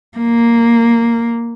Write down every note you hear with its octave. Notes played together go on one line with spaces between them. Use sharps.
A#3